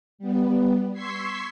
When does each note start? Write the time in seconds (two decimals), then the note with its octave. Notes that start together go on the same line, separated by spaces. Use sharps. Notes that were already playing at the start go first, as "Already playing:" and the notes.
0.19 G3 B3
0.93 C6 C#6 E6 G#6 B6 C7